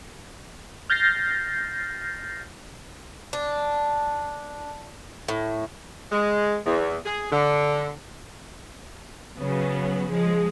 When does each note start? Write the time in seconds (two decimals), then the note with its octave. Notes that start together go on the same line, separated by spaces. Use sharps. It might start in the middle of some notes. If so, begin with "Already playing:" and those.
0.90 F6 G6 A6 A#6 C7
3.33 D4
5.28 A2
6.12 G#3
6.66 E2
7.06 G#4
7.32 D3
9.38 C#3 F#3 B3
10.11 F3 G#3